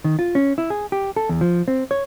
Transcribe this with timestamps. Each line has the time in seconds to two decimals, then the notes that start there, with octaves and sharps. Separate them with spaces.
0.04 D#3
0.19 F4
0.35 C#4
0.58 E4
0.70 G#4
0.92 G4
1.16 A4
1.29 E2
1.41 F3
1.68 C4
1.91 C#5